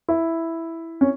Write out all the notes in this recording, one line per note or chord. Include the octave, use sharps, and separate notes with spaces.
E4
C#4